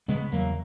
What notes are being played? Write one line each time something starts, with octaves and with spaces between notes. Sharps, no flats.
C#3 G#3 B3
E2 F#3 A#3